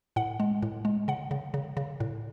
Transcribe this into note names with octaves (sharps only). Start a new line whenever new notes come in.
A2 F#5
G#3
A2
G#3
C#3 F#5
C#3
C#3
C#3
A2